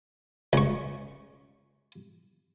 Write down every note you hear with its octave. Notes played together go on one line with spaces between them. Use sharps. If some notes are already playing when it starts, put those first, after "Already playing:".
C#2 C#6